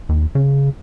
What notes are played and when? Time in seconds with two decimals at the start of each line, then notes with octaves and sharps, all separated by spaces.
0.09 D#2
0.35 C#3